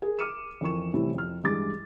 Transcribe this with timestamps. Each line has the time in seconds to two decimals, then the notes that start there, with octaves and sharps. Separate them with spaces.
0.02 G#4 A#4
0.19 D6 F6 C#7 D#7 E7
0.61 F2 E3 A#4 C#6 E7
0.94 A2 C3 E3 G3 E4
1.14 F2 F6
1.44 G2 E3 G#3 G#4 D6 A6